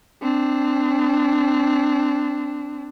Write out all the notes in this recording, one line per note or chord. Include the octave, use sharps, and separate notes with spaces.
C4 D4